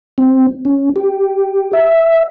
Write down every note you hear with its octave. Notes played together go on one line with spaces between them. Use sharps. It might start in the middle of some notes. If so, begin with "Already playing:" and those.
C4
C#4
G4
E5